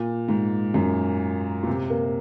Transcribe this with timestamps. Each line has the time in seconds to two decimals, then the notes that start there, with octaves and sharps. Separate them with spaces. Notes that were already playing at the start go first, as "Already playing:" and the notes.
Already playing: A#2
0.28 G#2
0.74 F#2
1.63 A#2
1.67 C3
1.90 A#3